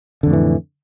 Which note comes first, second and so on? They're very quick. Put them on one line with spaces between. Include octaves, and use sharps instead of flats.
D3 F2 A2 E3